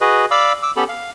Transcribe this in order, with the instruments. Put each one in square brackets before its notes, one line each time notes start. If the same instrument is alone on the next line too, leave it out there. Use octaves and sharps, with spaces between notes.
[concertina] F#4 G#4 B4 D#5
D5 F5 B5 D6 E6
D6 E6
B3 C#4 G4 A4 B5
F5